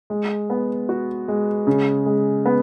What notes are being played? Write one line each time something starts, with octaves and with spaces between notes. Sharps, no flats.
G#3
B3
F#4
G#3
C#3
G#3
B3